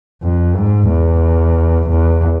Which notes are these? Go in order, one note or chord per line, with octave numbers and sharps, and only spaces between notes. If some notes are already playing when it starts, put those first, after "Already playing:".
F2
G#2
E2
E2